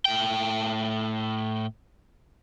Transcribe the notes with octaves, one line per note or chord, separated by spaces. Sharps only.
A2 G5